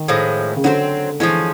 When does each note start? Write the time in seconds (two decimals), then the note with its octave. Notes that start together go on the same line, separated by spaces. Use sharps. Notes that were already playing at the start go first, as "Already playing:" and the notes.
Already playing: D#3
0.08 A2 F3 G#3
0.56 C#3
0.64 D3 F#3 A3 C4
1.20 E3 F3 G#3 C#4